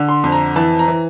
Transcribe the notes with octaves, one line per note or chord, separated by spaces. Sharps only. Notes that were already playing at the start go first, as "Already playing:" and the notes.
Already playing: D3
C6
F2
A#5
E3 A5
A#5
E3